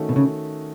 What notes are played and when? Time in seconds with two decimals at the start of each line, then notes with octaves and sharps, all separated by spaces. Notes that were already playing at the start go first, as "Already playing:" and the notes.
Already playing: D#3 A3 C#4 F#4
0.09 B2
0.16 C#3